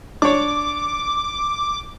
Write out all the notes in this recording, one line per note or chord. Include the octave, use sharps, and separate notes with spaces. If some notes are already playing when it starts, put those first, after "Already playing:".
D4 C#5 D6